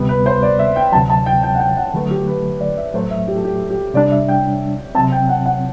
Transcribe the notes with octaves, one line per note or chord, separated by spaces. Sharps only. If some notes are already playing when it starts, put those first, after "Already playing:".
Already playing: D2 C3 G3 B3
B4
C5
D5
E5
G5
D2 C3 F#3 A5
A5
G5
G5
F#5
G5
F#5
D3 F#3 A3 B4
G4
B4
D5
E5
A2 F#3 A3 C5
E5
G4
A4
G4
G4
C3 G3 D4 D5
E5
G5
C3 F#3 C4 A5
G5
F#5
F#5